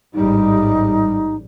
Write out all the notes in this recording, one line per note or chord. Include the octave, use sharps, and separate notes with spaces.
A1 G#2 G3 D#4